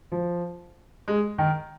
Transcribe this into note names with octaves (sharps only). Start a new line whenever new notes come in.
F3
G#3
D#3